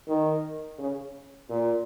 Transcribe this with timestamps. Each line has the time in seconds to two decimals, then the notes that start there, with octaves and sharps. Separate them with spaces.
0.08 D#3
0.79 C#3
1.50 A#2